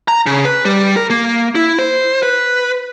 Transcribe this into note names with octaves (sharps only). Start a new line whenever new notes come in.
A#5
C#3
B4
G3
A#4
A#3
E4
C5
B4